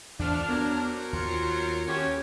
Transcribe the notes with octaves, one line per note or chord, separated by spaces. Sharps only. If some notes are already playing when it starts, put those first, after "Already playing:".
E2 F3 A3 D4 F6
F#3 B3 A#4 C5
D#2 F4 C#7
A3 C#4 F#4 G4 B4 C#5